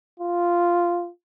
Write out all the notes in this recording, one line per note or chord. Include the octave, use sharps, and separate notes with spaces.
F4